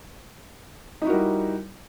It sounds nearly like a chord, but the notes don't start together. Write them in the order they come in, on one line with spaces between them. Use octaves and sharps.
D#4 E4 F#4 A#4 G3